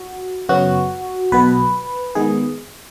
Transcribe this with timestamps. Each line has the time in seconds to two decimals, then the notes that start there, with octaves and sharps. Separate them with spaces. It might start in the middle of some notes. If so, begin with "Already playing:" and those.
Already playing: F#4
0.49 F#2 C#3 F#3 B3 F#4
1.32 B1 B2 B3 B4
2.15 D#3 G#3 B3 G#4